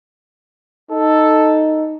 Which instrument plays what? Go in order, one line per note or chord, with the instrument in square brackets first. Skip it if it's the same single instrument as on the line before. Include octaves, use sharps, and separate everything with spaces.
[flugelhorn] D#4 [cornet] A4